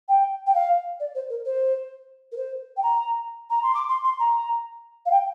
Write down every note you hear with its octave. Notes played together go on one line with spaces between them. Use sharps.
G5
G5
F5
D5
C5
A#4
C5
A#4
C5
G5
A#5
A#5
C6
D6
C6
C6
A#5
F5
G5